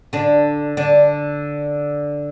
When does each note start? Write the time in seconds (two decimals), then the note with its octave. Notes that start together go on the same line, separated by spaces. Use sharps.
0.13 D3 D4
0.77 D3 D4